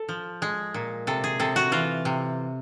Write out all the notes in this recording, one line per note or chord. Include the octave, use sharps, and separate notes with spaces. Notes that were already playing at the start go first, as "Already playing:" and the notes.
Already playing: A4
F3
G#3
A#2
C3 A4
G#4
C3 A4
F#4
E3 F4
C3